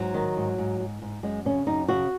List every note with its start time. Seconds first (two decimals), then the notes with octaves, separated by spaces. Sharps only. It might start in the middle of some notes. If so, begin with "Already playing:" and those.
Already playing: G#2 F#3
0.14 D#3
0.37 G#2
0.58 G#2
0.80 G#2
1.02 G#2
1.23 F#2 G#3
1.45 C#3 C#4
1.67 F#2 D#4
1.88 C#3 F#4